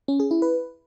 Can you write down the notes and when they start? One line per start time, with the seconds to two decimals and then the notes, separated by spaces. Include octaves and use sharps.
0.08 C#4
0.20 G#4
0.31 E4
0.42 B4